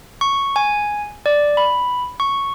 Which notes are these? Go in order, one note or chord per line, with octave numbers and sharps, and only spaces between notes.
C#6
G#5
D5
B5
C#6